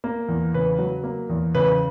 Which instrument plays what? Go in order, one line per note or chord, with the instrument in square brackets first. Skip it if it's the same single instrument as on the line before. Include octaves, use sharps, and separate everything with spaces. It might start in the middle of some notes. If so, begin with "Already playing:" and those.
[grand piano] A#3
E2
C#3 B4
F#3
A#3
E2
C#3 B4